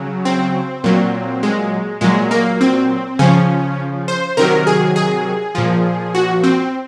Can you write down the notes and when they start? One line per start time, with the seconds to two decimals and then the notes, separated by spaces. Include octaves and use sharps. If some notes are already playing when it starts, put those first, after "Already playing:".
Already playing: C#3 F#3
0.25 C4
0.84 A#2 F#3
1.43 G#3
2.01 A#2 F#3 G#3
2.31 A#3
2.61 C4
3.19 C#3 F3 C#4
4.08 C5
4.37 C3 D#3 F#3 A#4
4.67 G#4
4.96 G#4
5.55 A#2 F3
6.15 F#4
6.43 C4